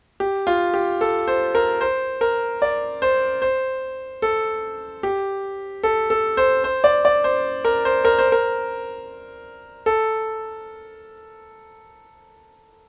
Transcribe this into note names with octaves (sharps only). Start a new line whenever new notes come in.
G4
F4
G4
A4
C5
A#4
C5
A#4
D5
C5
C5
A4
G4
A4
A4
C5
C5
D5
D5
C5
A#4
C5
A#4
C5
A#4
A4